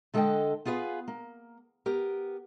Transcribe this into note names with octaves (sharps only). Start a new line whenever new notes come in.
D3 G#3 A4 D5 D#5 G5
B3 F4 G#4 B4 F5
A#3
B3 G4 A#4